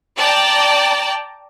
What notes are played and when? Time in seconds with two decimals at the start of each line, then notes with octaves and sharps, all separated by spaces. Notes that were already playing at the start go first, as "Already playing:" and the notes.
0.16 D5 G5 A5 A#5